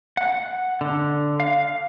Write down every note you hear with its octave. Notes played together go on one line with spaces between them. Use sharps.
F#5
D3
F5